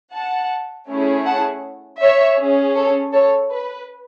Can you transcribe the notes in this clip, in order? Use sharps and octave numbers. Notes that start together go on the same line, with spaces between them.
F#5 A5
A3 C#4 E4 G#4
F#5 A5
C#5 E5
C#4 G#4
A4 C#5
A4 C#5
B4